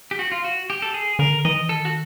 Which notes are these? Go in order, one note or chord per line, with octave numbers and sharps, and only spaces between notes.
G4
F#4
F4
F#4
G4
A4
G#4
D3 A#4
E3 D#5
D#3 A4
F#4